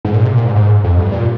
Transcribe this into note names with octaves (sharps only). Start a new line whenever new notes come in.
G#2
A#2
C3
A#2
G#2
G#2
F2
G2
A#2